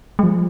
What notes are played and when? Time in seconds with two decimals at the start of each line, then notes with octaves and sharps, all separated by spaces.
0.19 G#3
0.23 F3